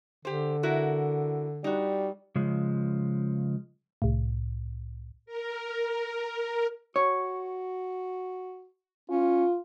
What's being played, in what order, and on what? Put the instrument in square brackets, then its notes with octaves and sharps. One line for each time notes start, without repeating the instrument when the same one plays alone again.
[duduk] D3 [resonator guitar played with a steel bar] G4 C5
[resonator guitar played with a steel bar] E4 F#4 A#4
[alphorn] G3 [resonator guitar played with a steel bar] D#4 F#4
[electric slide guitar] C#3 F3 G#3
[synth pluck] C2 A2
[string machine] A#4
[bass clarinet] F#4 [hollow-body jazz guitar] C#5
[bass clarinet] C#4 [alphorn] F4